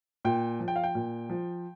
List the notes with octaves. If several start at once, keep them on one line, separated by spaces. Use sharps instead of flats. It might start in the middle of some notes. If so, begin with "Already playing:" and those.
A#2 G5
F3
G5
F5
G5
A#2
F3